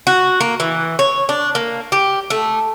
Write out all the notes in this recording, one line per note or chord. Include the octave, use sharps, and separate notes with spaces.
F#4
A#3
E3
C#5
D4
A#3
G4
A3